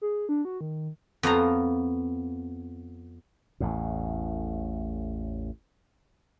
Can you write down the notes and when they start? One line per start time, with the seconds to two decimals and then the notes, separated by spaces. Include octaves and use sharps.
0.01 G#4
0.29 D4
0.45 F#4
0.61 D#3
1.23 F2 B3 F5 A#5
3.60 A1 E2 A2